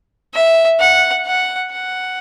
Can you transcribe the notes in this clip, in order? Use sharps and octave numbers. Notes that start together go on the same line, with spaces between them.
E5
F#5
F#5
F#5